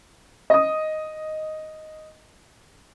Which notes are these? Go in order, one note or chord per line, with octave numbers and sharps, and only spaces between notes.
D#5 D#6